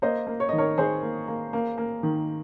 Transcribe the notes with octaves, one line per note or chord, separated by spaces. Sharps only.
A#3 C5 D#5
A#3
C#5
D#5
D#3
A#4 C#5
D#3 G#4 C5
A#3
A#3
A#3
A#3
D#3